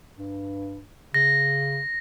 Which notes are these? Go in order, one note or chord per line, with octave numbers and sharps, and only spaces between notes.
G2
C#3 A#6